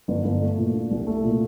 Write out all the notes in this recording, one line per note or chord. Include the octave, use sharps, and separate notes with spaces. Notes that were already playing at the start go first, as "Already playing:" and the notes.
G1
G1
A3
A#2
D4
C2
A3
A#2